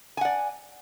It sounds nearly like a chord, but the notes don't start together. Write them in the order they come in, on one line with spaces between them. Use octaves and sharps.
G#5 F#5 D5